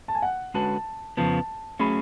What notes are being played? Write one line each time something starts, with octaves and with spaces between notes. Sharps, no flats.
A5
G#5
F#5
D3 G#3 C#4 F#4 B4 A5
F2 C#3 F3 B3 A5
F#3 A3 C#4 G#4 B5